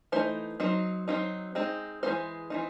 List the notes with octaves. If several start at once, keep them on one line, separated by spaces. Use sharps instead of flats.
E3 A3 D#4 C5
F#3 C4 D#4
F#3 C4 D#4
G#3 C4 D#4
E3 G#3 C4 D#4 C5
E3 C4 D#4